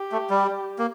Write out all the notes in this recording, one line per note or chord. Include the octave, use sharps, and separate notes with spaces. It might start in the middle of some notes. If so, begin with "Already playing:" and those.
Already playing: G4
A3
G3
A#3